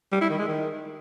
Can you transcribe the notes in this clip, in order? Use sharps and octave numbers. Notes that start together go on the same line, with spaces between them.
G3
E4
D#3
G#3
D#3